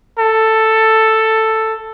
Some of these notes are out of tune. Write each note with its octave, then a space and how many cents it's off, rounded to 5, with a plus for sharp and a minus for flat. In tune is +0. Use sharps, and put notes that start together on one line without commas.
A4 +5